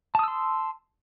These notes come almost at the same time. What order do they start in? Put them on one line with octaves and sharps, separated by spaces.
A5 D#6 E6 C6